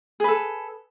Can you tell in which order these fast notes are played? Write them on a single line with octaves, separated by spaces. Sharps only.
G#4 B4 A4